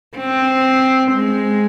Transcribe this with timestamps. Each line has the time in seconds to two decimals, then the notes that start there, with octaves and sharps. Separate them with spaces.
0.18 C4
1.13 G#3